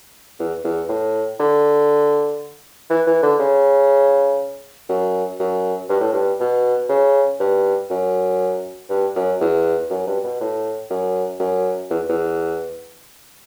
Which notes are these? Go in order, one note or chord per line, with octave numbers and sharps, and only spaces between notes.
E2
E2
A2
D3
E3
E3
D3
C#3
F#2
F#2
G2
A2
G2
B2
C#3
G2
F#2
G2
F#2
E2
F#2
G2
B2
A2
F#2
F#2
E2
E2